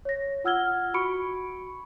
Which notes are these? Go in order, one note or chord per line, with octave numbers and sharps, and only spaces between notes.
C#5 A#6
F4 F#5 E6 F6 G#6 G7
F#4 B5 C#6 C#7 D7